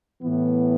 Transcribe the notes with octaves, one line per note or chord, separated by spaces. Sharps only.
A2 E3 B3